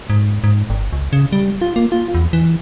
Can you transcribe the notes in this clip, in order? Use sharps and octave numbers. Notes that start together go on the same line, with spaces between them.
G#2
G#2
G1
C#2
C#3
G3
F4
A#3
F4
E2
E3